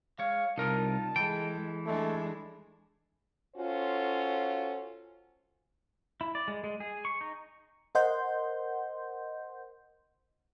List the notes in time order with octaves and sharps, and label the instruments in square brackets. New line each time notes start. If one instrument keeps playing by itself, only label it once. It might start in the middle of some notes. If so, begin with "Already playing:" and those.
[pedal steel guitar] G#3 C#5 [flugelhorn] F5
[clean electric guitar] C2 A#4 [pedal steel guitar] D#4 F4 [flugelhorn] A5
[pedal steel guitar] E3 A4 [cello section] G#3 [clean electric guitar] G5
[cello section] G#3 D4 [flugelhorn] A3
[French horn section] C#4 F4 F#4 A4 C5
[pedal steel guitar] E4
D5
G#3
G#3
G#4
C#6
D#4
[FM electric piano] A#4 C5 D#5 F#5 C6 G6